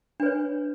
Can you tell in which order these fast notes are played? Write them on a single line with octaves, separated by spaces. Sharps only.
D4 B4 C#5